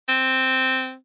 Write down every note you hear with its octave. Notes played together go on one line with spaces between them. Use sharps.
C4